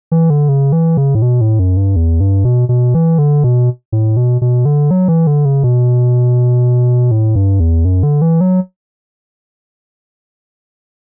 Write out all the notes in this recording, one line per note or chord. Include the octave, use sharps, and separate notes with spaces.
E3
D3
C#3
E3
C#3
A2
B2
A2
F#2
G2
E2
G2
B2
B2
E3
D3
B2
A2
B2
B2
D3
F#3
E3
D3
C#3
B2
A2
G2
E2
F#2
D3
E3
F#3